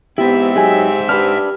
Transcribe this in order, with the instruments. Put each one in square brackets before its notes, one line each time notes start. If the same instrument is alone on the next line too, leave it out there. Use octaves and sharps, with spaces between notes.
[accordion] G#2 C4 E5 [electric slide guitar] B3 E4 [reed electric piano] G4
[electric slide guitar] F#3 D#4 [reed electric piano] G4 G#4 G#5
[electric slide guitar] D4 B4 [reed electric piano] G4 F6